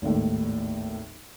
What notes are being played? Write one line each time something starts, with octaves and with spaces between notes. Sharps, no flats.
G#1 D#2 A2